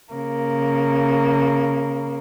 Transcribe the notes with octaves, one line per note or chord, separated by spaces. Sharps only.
C#3 A#3